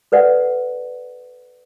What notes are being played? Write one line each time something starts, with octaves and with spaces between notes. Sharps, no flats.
A4 B4 D5 F#5